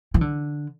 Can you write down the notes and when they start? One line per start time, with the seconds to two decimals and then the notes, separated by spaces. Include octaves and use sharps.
0.14 E3
0.21 D3